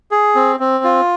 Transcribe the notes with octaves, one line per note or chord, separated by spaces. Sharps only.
G#4
C4
C4
F4